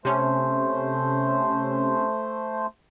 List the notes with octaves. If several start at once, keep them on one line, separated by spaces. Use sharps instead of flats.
C3 A3 C#4 C5